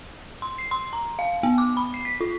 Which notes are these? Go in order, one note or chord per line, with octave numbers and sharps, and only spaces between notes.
C6
C7
C6
A#5
F5
B3
D6
B5
C7
B6
F4